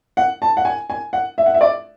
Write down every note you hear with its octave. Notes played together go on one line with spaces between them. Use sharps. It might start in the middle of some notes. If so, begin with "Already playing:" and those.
F#5
A5
F#5
G#5
G#5
F#5
E5
F#5
E5
D5